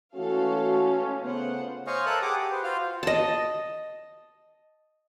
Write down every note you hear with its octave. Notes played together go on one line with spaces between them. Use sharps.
E3 A3 C#4 F#4 A4 F5
C#3 A3 B3 F4 C5 F#5
C5 C#5 D#5 F5 G#5 C#6
A4 A#4 E5 A5 D#6 F#6
G4 G#4 F#5 D6 D#6
G4
B4 C5
F4 F#4 C5 F5 F6
D#5 A5